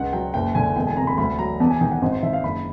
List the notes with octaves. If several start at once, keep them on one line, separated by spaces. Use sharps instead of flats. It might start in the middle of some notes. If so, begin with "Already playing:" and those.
Already playing: C#2 F#5
F#3 G5
F#1 G5
D3 G#5
E1 G5
G#5
C3 A#5
B5
D2 B5
F#3 A#5
E2 A5
G#5
D#3 G5
F#5
G#1 C5
C5
D#3 E5
F5
F#1 B5